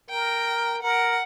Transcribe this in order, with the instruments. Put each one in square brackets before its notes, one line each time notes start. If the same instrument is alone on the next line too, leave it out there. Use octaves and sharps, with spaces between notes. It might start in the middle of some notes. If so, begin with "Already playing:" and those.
[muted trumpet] A#4 [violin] G5
[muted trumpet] A#4 [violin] F#5